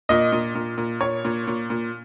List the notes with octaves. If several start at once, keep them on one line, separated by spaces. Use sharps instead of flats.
A#2 D#5
A#2
A#2
A#2
A#2 C#5
A#2
A#2
A#2